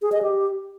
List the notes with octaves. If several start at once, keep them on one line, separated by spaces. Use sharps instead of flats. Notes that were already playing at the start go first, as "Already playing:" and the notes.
G#4
D#5
G4